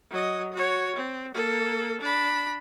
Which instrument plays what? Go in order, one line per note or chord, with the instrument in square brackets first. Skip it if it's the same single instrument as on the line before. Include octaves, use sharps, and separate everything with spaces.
[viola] F#3 D#5
F#4 C#5
C4
A#3 A4
D4 B5